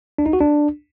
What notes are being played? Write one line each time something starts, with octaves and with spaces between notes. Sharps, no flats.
D4
D#4
F#4
D4